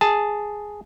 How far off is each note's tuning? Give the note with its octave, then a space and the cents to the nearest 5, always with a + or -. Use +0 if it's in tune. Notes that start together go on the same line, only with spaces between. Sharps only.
G#4 +0 A5 +0